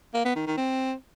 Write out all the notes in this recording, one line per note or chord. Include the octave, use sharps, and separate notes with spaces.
A#3
B3
D#3
D#3
C4